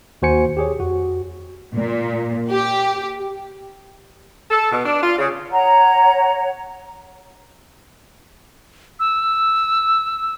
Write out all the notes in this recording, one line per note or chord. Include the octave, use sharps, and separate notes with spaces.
D#2 F#4 C5 G#5 C#7
G4 G#4 C#5
F2 F#4
A#2
G4
A4
B2
D4
F4
C#3
C#5 F#5 A#5
E6